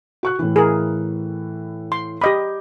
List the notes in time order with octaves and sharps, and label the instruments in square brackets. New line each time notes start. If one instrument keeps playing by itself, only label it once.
[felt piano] F#4 C#6 F#6
A2 E3
[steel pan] G#4 A#4
C6
[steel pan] G4 D#5 B5 [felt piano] D6 G6